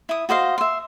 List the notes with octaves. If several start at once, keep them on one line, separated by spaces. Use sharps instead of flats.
E4 D#6
F#4 C5 D#5 F5
E5 C6